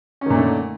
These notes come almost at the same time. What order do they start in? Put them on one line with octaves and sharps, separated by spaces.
C#4 D#3 A#2 A3 D3